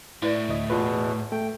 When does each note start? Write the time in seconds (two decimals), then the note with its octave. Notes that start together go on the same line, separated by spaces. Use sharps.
0.22 A2 E4 B4 D5
0.49 D2 D#5
0.70 E2 B2 A#3 F4 B4
1.32 A3 G5